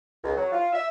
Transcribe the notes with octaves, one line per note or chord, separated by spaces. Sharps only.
C#2
F#3
F4
E5